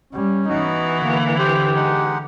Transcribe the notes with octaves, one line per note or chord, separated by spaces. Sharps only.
G3 C#4
E3 B3 D#4 F#4
D3 A#3
G4 C5
G#3 D#4 F#5